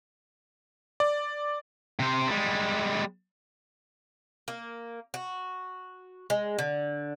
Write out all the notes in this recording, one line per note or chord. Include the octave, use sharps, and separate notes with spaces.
D5
C3 C5
G3 G#3
A#3
F#4
G#3
D3